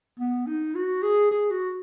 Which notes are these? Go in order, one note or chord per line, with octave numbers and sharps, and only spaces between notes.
B3
D#4
F#4
G#4
G#4
F#4